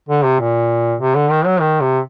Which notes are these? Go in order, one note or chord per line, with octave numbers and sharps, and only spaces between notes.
D3
C3
A#2
C3
D3
D#3
F#3
D#3
C3